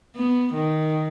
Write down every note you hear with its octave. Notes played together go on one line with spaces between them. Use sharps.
B3
D#3